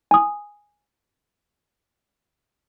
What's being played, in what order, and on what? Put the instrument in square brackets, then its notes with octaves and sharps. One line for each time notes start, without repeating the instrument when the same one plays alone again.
[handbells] G#5 D#6